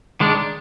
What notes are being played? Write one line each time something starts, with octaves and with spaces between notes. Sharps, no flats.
D#3 G#3 D4